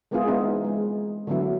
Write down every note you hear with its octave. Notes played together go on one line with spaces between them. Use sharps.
G#3 A#3 B3 E4 F4 G#4
E3 G#3 B3 C4 D#4 E4
G#3
D3 E3 F#3 B3 E4